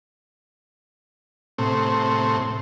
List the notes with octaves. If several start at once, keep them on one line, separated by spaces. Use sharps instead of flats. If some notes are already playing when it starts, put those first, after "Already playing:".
A2 C3